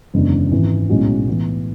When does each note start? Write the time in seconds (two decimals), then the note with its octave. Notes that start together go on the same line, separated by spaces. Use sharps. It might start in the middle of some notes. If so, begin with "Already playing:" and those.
0.14 F#1 E2 D3 G#3 D4
0.51 G#1 G#2 E3
0.89 B1 A2 G#3 C#4 F#4
1.27 A2 E3 B3